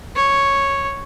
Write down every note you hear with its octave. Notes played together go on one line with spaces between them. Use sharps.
C#5